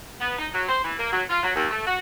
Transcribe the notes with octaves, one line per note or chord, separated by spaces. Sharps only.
B3
D#4
F#3
C5
E3
A#3
F#3
F4
F#3
D#2
A3
F#4